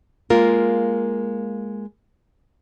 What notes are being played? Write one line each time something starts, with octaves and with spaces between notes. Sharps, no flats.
G#3 A#3 F4 A#4